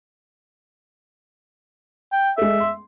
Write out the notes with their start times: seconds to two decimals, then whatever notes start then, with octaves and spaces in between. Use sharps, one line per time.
2.12 G5
2.38 G#3 A4 E5
2.60 C6